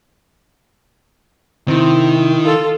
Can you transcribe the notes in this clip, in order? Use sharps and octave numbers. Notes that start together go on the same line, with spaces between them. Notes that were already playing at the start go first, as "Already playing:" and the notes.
C3 D#3 C4 E4
F4 A4